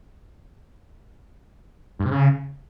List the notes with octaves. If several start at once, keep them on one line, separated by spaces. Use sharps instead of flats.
G2
C3
C#3